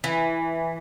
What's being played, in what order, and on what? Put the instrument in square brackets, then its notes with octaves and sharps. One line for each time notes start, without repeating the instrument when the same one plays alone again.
[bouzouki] E3